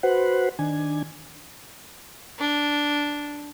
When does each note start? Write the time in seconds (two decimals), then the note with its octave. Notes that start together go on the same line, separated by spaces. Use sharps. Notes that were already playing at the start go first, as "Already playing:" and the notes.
0.03 F#4 B4 C5 F#5
0.59 D#3 D4 G#5
2.39 D4